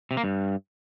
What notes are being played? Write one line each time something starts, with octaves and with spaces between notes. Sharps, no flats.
C3
A#3
G2